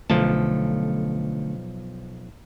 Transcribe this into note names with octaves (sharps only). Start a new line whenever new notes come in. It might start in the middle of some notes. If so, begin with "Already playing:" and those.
B1 D3 F3 A3 A5